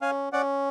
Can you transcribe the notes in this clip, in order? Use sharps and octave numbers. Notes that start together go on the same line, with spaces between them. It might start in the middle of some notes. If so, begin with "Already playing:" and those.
C#4 F5 G#5
C#4 D5 F#5